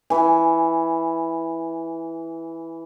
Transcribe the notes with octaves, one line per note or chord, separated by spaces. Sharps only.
E3 G#5